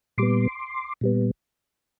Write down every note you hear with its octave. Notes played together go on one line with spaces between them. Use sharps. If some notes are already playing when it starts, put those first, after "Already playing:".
A#2 G3 B3 C6 D6
A#2 G3 B3